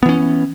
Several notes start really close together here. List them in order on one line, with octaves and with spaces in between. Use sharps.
B3 E3 C#4